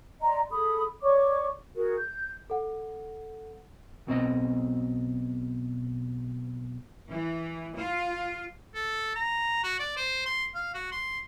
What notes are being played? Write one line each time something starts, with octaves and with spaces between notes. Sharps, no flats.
D5 D#5 A#5 C6
G#4 A4 B5 D#6
C#5 D5 C#6 D6
F#4 G#4 A#4
G6
A4 F#5
B1 B2 C4 D#5
E3
F4
A4
A#5
F#4
D5
C5
C6
F5
F#4
C6